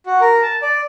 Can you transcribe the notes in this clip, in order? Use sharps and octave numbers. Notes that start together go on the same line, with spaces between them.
F#4
A#4
A5
D5